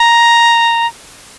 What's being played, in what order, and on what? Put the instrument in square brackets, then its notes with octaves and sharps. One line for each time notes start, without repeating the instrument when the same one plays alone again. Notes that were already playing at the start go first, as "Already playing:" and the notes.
Already playing: [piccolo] A#5